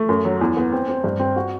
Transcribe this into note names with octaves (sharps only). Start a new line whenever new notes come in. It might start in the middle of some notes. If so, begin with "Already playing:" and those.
Already playing: A3
F#2
F#3
E2
B3
C4
C4
G2
C4
F#4